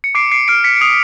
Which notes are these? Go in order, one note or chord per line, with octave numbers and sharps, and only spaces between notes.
C#7
D6 C7 D7
C7 D7
F6 C7 D7
B6 C#7
C#7
D#6 C7